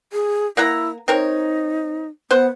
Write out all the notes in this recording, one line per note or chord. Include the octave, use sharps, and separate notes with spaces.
G#4
A#3 E4 F#5 A#5
C4 D#4 A#4 C#5
B3 C5 F#5